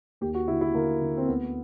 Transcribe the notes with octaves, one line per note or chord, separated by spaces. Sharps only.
D#2 G4
F#4
D3 E4
E4
D3 A#3
D3
C4
D2 B3